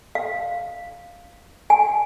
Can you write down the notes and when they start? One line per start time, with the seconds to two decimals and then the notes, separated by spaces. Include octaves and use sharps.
0.15 F5
1.70 G#5